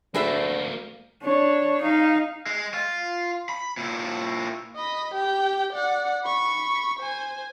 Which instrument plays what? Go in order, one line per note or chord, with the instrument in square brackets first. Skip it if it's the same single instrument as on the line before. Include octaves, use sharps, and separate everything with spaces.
[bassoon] D2 [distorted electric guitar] A3 A#3 [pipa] G#4 B4 E5
[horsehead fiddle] D4 C#5
D#4 F5
[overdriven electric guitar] G#3
F4
B5
A#2 E4
[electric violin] D#5 B5
G4 G5
D5 F#5
B5 C#6
C5 G#5